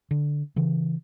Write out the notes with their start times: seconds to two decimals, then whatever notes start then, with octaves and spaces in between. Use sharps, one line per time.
0.11 D3
0.56 C#3 E3